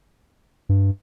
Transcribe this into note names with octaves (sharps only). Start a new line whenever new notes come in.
G2